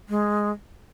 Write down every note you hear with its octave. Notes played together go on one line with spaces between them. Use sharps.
G#3